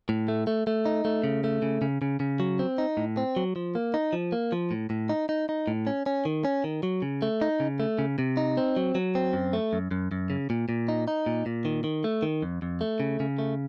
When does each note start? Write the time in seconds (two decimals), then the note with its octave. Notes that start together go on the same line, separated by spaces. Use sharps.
0.09 A2
0.28 A3
0.47 A3
0.67 A3
0.86 D#4
1.05 A3
1.24 C#3
1.44 A3
1.62 C#3
1.82 C#3
2.02 C#3
2.20 C#3
2.40 F#3
2.59 C4
2.78 D#4
2.97 A2
3.17 C4
3.36 F#3
3.56 F3
3.75 A#3
3.94 D#4
4.13 F3
4.32 A#3
4.52 F3
4.71 A2
4.90 A2
5.09 D#4
5.29 D#4
5.49 D#4
5.68 A2
5.87 C#4
6.06 C#4
6.25 D#3
6.45 C#4
6.64 D#3
6.83 F#3
7.02 C#3
7.22 A3
7.41 D#4
7.60 C#3
7.80 A3
7.99 C#3
8.19 C3
8.37 D#4
8.57 C4
8.76 F#3
8.95 F#3
9.15 C4
9.33 F#2
9.53 A3
9.73 F#2
9.91 F#2
10.12 F#2
10.30 C#3
10.50 A#2
10.69 A#2
10.88 D#4
11.08 D#4
11.26 A#2
11.46 A#2
11.65 D#3
11.84 D#3
12.04 A3
12.23 D#3
12.42 F2
12.62 F2
12.81 A3
13.00 C#3
13.20 C#3
13.38 A3